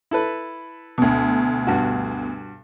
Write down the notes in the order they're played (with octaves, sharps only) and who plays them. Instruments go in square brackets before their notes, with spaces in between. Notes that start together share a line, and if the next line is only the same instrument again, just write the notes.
[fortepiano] E4 A4 B4
[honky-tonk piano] D2 B2
[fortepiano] G2 F#4